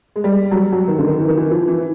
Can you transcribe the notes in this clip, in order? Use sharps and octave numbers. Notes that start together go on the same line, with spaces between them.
G#3
G3
F#3
G3
F#3
D#3
D3
D#3
E3
D#3
E3
F3
E3